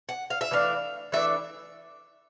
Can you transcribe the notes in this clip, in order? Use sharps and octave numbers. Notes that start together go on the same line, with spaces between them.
F#5
F5
E5
E3 A3 D4 F5
E3 A3 D4 E5